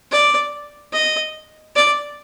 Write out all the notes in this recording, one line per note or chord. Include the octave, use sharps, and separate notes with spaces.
D5
D#5
D5